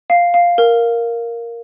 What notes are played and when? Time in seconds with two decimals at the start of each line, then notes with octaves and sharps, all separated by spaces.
0.10 F5
0.34 F5
0.58 A#4